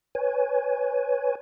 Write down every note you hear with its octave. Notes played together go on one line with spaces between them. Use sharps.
B4 C#5 G#5